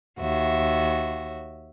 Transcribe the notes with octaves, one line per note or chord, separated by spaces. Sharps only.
D#2 F#4 E5